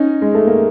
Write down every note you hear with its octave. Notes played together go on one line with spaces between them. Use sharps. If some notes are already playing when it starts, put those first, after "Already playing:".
Already playing: C#4 D#4
G#3
A3
A#3